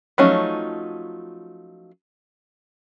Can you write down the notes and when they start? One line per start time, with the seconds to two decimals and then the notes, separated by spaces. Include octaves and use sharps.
0.18 F3 F#3 A3 C#4 D#4